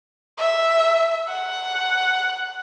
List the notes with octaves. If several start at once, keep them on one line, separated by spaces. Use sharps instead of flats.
E5
F#5